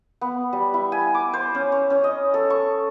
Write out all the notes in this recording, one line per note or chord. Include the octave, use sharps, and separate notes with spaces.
B3
G3
E4
G#5
D6
C5
C#4
C#5
C#4
D#5
A4
C#6